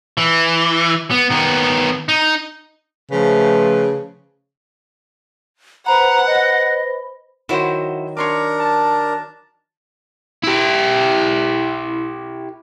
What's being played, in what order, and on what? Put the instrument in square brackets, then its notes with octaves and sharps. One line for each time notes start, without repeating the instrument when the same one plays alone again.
[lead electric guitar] E3
B3
D#3 B3
D#4
[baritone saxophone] C#3 [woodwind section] F3 A3 B4
[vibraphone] B4 C5 B5 [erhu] F#5 [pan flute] A#5
[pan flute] D#5
[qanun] D#3 F#3 [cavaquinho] E4 F#4 C5
[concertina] D4 A#4 [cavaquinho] C#5 C6 D6
[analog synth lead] A5
[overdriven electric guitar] E4 G4